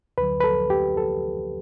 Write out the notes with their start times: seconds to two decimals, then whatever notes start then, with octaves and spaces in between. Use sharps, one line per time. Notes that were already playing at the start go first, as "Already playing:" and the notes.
0.18 D2 D3 F#3 B4
0.41 B4
0.44 A4
0.70 G4
0.97 A4